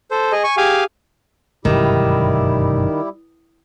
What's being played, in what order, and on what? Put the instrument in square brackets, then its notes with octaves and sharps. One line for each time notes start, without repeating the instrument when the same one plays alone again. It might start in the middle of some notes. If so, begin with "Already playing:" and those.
[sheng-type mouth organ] A4 C5
G#4 D#5
G#5 C#6
G4 G#4 F5 G#5
[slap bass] G1 F#2 G#3 [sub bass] B2 [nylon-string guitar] D#3 [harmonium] G3 E4 G4